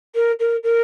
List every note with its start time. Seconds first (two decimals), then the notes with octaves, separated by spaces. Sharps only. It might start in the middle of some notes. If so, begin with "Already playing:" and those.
0.15 A#4
0.39 A#4
0.63 A#4